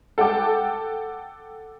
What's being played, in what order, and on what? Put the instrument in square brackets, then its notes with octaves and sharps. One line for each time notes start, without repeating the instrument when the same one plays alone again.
[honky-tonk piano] A4 F#5 G5 D6